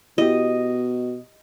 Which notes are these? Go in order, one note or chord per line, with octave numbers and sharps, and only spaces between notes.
B2 E4 G4 D#5